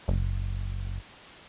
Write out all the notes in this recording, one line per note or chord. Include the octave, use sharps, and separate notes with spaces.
F#1